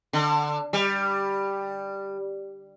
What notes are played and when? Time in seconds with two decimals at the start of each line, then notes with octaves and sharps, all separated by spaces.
0.13 D3
0.73 G3